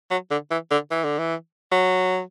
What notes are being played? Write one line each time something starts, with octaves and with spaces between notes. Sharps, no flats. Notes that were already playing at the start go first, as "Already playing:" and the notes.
F#3
D3
E3
D3
E3
D3
E3
F#3